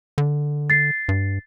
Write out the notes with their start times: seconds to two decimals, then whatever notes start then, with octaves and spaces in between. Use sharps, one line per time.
0.18 D3
0.70 A6 C7
1.09 G2